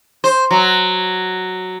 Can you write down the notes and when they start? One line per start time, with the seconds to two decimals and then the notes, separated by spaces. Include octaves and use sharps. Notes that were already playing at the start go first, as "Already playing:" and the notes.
0.24 C5
0.51 F#3